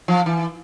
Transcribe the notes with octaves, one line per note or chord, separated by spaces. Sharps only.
F3
E3